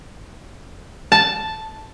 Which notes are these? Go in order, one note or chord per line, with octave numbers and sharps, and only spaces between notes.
A5